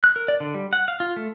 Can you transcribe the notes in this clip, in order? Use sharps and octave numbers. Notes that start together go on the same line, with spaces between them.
F#6
A#4
D5
D3
G3
F#5
F5
F4
A3